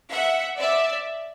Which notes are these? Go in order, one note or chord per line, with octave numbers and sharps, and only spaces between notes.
E5 F#5
D5 E5